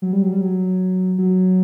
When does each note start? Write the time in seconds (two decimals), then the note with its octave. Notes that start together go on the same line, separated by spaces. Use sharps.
0.02 F#3
0.13 G3
0.22 F#3
0.32 G3
0.41 F#3
1.18 F#3